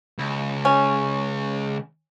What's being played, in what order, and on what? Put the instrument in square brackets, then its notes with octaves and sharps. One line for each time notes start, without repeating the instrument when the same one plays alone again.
[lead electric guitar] C#2
[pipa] C#4